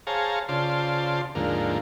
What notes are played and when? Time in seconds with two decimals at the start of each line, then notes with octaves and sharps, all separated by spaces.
0.07 G#4 C5 C#5 F5 A5 A#5
0.49 C#3 F4 C5 D5 A5 C6
1.35 D#2 G#2 D3 F3 A#3